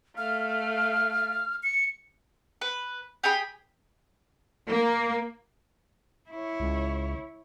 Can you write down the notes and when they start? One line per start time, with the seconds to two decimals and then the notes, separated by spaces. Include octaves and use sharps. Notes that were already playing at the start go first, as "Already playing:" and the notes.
0.17 A3 F5 F6
1.63 C#7
2.61 B4
3.23 G4 G#4 G5 B5
4.68 A#3
6.30 E4 C#5
6.60 C#2